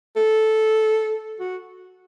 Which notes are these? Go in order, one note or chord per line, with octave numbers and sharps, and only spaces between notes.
A4
F#4